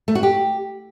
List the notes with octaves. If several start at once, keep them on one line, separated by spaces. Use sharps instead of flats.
A3
F#4
G4